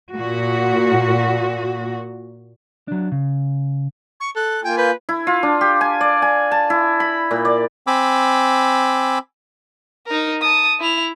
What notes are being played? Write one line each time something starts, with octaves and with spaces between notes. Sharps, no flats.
A#2 F#4
F#3 D4
C#3
C#6
A4 F#6
A#3 F4 G5 G#5
B4 G6
E4
F4
D4
G4
G#5
D5
G#5
A5
E4
B5
A#2
D5
C4 G#5 B5 D6 E6
D#4 A#4
A5 D#6
E4 F7